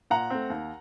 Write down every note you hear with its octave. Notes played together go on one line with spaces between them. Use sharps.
A#2 F#5 A#5
A3 C4
D#2